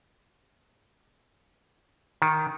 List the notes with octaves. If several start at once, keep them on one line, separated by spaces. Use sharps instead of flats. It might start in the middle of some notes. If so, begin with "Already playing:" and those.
D#3